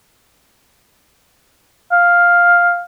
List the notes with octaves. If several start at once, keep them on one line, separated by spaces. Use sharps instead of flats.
F5